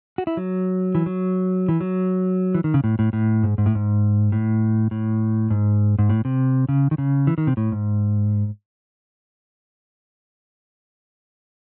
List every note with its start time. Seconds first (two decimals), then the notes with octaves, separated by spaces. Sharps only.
0.18 F#4
0.27 E4
0.37 F#3
0.95 E3
1.06 F#3
1.69 E3
1.81 F#3
2.55 E3
2.64 D#3
2.74 C#3
2.84 A2
2.99 A2
3.13 A2
3.43 G#2
3.58 G#2
3.66 A2
3.75 G#2
4.32 A2
4.91 A2
5.50 G#2
5.99 G#2
6.09 A2
6.25 C3
6.69 C#3
6.91 D#3
6.98 C#3
7.27 E3
7.38 D#3
7.47 C3
7.57 A2
7.72 G#2